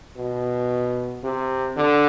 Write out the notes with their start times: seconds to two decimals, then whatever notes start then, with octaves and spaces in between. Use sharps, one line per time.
0.16 B2
1.23 C3
1.76 D3